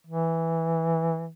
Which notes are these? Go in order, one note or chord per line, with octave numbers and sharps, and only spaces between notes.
E3